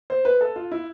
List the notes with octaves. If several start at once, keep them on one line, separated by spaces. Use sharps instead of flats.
C5
B4
A4
F4
E4